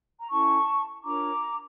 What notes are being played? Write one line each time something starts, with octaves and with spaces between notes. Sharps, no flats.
A#5
C#4 E4 A4 A5 C#6
D4 F4 A#4 C#5 A#5 D6